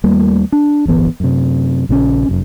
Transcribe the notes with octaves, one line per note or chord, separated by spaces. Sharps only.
D#2 G3 A3 A#3
D4
D1 G1 E3 B3
F#2 C3
A#1 C#3 F3 C#4
F1 F#2